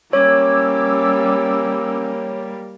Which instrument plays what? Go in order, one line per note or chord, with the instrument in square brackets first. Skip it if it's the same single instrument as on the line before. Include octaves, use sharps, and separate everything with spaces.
[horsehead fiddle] G3 A#3 [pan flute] C#4 [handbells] C#5 [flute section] D6 E6